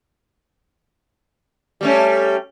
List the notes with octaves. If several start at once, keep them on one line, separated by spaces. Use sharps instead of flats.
G3 A3 C#4